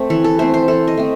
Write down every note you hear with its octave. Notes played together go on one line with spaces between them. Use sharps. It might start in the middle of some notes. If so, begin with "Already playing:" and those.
Already playing: A3 C4
E3 A4
A4
A3 C4 C5
C5
E3 A4
D#5
A3 C4